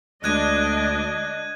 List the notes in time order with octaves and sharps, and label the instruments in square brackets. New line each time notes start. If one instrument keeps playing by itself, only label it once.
[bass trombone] D2 [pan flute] G#3 [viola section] D4 D#5 [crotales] F#6 G#6 D#7